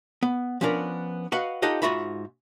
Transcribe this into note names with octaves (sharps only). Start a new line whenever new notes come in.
B3
F3 B3 C#4 D4 A#4
F#4 B4 D#5 F5 F#5
D#4 F4 G4 A4 D#5 F#5
G#2 A3 F4 F#4 E5 B5